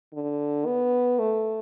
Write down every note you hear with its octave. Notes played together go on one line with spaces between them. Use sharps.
D3
B3
A3